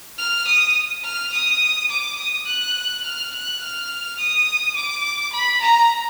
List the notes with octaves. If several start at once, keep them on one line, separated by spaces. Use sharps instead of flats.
F6
D#6
F6
D#6
D6
D#6
F#6
F6
F#6
F6
D#6
D6
B5
A#5